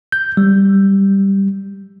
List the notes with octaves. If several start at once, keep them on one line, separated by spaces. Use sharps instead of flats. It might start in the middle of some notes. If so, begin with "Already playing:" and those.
G6
G3